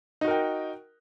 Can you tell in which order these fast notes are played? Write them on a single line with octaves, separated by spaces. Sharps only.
D#4 F#4 A#4 G5